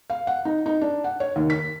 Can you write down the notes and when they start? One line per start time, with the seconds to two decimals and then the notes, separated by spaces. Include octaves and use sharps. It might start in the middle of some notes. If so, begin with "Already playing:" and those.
0.10 F5
0.27 F#5
0.45 D#4
0.66 D#4
0.81 D4
1.04 F#5
1.20 C#5
1.36 D#2
1.50 B6